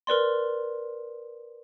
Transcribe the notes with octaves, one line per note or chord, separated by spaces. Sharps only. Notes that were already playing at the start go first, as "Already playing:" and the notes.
A#4 B4 D5 C6